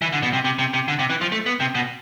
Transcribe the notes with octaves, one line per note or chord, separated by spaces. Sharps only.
E3
D3
B2
C3
C3
C3
C3
D3
C3
E3
F3
A3
B3
C3
B2